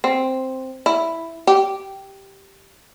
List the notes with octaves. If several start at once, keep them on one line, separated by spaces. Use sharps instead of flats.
C4
E4
G4